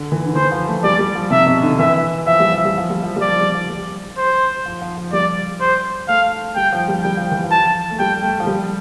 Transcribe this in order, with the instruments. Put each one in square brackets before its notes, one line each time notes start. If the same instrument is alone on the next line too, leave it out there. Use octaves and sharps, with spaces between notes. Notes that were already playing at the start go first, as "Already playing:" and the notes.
Already playing: [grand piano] D3
E3
D3
[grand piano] E3 [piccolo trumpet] C5
[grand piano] F3
A3
[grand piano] G3 [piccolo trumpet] D5
[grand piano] G3
F3
[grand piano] C3 [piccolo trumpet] E5
[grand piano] B2
D3
[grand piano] E3 [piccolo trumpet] E5
[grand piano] F3 [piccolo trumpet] E5
[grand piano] G3
F3
G3
F3
G3
F3
G3
[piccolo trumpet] D5
[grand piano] F3
G3
F3
G3
[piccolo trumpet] C5
[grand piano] F3
F3
F3
[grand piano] G3 [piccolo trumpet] D5
[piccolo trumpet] C5
[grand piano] A3 [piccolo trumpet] F5
[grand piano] G3 [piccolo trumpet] G5
[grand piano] F3
G3
[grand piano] G3 [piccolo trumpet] G5
[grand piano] F3
E3
F3
[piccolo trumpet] A5
[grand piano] A3
[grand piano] G3 [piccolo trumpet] G5
[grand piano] A3
F3
G3